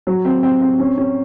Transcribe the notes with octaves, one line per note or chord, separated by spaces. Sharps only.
F#3
C4
C4
C4
C#4
C#4